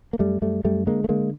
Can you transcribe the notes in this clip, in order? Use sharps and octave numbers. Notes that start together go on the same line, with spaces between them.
A#3
F#2 G3 A3
F#2 G3 A3
F#2 G3 A3
D3 G#3 A#3
A3
D3 G#3 A#3